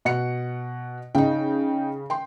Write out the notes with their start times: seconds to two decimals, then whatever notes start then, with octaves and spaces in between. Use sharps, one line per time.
0.05 B2 F#5 C#7
1.15 C#3 D#4 G5
2.10 G5 C6